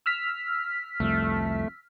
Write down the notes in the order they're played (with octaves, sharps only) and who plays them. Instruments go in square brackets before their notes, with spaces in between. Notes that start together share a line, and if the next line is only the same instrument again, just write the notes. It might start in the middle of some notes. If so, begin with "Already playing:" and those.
[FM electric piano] E6 F6 B6
[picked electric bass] C2 F2 [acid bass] A3